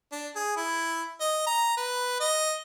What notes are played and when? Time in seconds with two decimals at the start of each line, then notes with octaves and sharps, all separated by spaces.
0.12 D4
0.36 G#4
0.57 E4
1.20 D#5
1.47 A#5
1.77 B4
2.20 D#5